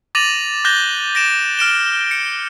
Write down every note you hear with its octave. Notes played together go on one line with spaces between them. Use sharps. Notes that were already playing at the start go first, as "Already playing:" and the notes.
D6 A6 A#6 D#7 F7 F#7
D6 F#6 G6 A#6 G7
A#6 D7 E7
F6 D7 E7 G7
C#7